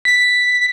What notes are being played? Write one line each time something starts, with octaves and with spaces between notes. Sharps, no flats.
B6